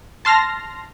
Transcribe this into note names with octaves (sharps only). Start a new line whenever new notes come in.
A5 C6 F6 A#6